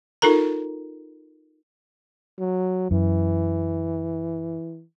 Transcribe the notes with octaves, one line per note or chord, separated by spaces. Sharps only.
D#4 F4 A4 A#4 A#5
F#3
F#2 E3